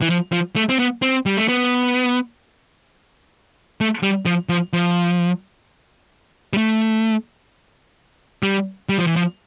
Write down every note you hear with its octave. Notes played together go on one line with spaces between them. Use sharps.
E3
F3
F3
A3
C4
B3
C4
G3
A3
B3
A3
G3
F3
F3
F3
G3
A3
G3
G3
F3
E3
F3